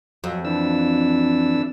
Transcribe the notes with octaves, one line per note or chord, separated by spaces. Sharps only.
F2 F#3
E3 D4 E6